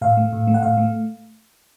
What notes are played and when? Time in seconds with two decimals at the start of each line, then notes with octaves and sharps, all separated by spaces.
0.01 A2 F5
0.17 A3
0.33 A2
0.47 A3
0.54 F#5
0.63 A2 F5
0.77 A3